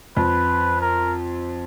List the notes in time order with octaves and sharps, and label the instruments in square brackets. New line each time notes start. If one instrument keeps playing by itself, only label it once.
[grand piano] F2 [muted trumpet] B4
[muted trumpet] A#4